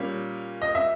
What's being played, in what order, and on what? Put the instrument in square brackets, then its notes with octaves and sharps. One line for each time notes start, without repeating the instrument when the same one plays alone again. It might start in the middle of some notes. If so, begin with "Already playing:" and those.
Already playing: [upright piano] A#2 G3 A#3 C#4
D#5
E5